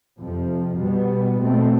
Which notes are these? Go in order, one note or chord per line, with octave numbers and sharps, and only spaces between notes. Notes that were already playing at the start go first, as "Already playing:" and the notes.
F2 C3 F3
B2 G3 B3
B2 A3 C4